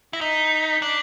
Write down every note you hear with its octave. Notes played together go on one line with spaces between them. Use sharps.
E4
A#6
D#4 B6
D4